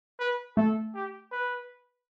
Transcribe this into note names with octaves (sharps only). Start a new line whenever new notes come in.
B4
A3 A4
G4
B4